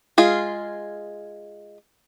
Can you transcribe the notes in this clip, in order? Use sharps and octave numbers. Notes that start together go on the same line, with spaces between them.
G#3 F4 G#4